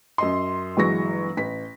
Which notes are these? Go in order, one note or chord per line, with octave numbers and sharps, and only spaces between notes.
F#2 D#5 C6
G1 E3 F#3 G#3 C#6 A#6
A1 B6